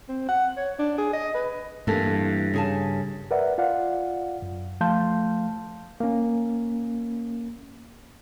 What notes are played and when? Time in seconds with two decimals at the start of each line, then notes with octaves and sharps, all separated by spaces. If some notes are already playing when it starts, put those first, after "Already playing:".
0.09 C4
0.29 F#5
0.57 C#5
0.79 D4
0.98 G#4
1.13 D#5
1.35 B4
1.87 G2 E3 A#3 A4
2.54 C#3 G#4 A5
3.31 A#4 B4 D5 E5 F#5
3.58 F4 D5 F5 F#5
4.42 F#2
4.81 F3 A3 F5 A5 C6 G6
6.00 A#3 C#4